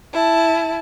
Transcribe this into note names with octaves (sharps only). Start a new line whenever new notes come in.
E4 A5